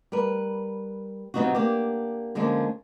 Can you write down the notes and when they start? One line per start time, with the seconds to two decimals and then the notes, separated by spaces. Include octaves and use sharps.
0.12 G3 A#4 B4
1.34 C3 F#3 B3 D#4 F4 F#4
1.55 A#3 D4 G4
2.35 D3 F3 G#3 A#3 C#4